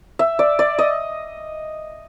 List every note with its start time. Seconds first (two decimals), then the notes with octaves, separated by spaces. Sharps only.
0.19 E5
0.39 D5
0.59 D5
0.79 D#5